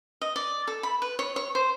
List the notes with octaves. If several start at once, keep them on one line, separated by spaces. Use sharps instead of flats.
D#5
D5
A4
B5
B4
C#5
C#5
C5